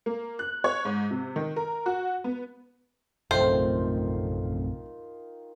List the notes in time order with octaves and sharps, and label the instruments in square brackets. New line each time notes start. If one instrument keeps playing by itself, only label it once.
[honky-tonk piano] A#3
F#6
C#5
G#2
C3
D#3
A#4
F#4
B3
[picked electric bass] A#1 F#2 C3 [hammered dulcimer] D#3 F4 [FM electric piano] A3 C4 [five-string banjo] C5